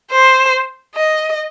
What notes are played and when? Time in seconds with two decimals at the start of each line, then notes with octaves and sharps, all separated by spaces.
0.12 C5
0.96 D#5